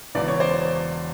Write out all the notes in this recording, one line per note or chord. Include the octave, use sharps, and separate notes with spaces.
E1 E2 C#3 E3 D5
C#5
C5 D5